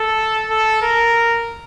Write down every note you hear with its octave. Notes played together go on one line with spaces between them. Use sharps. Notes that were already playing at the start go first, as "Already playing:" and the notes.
Already playing: A4
A4
A#4